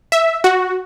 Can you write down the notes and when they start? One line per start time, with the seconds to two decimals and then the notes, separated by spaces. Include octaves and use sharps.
0.12 E5
0.44 F#4